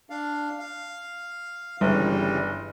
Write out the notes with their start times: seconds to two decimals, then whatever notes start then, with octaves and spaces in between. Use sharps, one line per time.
0.10 D4 F5
0.59 F5
1.81 G1 C#3 E3 G3